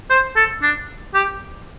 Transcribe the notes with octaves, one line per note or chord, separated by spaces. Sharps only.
C5
A4
D4
G4